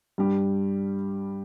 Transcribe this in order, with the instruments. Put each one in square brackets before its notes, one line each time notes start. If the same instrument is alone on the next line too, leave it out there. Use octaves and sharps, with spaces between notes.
[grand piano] G2 G3 D4 G4